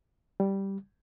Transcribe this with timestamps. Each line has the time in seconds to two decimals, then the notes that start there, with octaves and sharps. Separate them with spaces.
0.40 G3